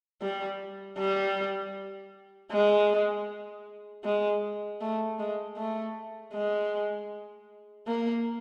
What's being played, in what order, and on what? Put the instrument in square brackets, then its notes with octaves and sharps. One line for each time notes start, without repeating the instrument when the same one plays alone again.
[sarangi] G3
G3
G#3
G#3
A3
G#3
A3
G#3
A#3